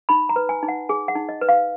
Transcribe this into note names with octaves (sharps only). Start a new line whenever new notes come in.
D#4 B5
A#5
B4
G#5
D#4
F#5
G#4 G#5
F#5
D#4
D#5
B4
F5